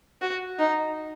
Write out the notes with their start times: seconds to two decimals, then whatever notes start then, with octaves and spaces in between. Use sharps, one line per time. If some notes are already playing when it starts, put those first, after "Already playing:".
0.21 F#4
0.59 D#4